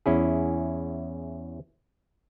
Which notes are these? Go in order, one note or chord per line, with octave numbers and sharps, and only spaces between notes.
E2 C#4 E4 G#4